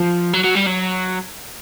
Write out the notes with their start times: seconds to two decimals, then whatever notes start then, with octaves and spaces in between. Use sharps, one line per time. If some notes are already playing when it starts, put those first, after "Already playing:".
Already playing: F3
0.33 F#3
0.44 F#3
0.55 G3
0.66 F#3